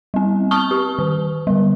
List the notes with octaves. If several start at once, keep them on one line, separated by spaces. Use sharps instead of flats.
G3 C4
A5 C#6 D#6 F6 G7
G4
D#3
D3 G3